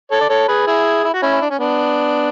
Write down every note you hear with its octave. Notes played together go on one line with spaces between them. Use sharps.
A4 C#5
D5
A4 C#5
G#4 B4
E4 G#4
E4
F#4
C#4 E4
D4
C#4
B3 D4